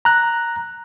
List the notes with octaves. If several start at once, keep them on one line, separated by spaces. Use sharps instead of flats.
A#5 F#6